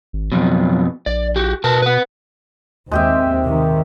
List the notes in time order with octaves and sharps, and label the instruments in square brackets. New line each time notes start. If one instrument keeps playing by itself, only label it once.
[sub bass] G#1
[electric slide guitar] F2 B2 [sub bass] F#3
[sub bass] A#1 [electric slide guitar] D5
[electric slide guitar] F#4 G4
[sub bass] B2 [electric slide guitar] A#4 B4 A5
[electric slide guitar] B4 F#5
[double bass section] D#2 C4 [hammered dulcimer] G#3 G4 E5
[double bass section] C3 D#3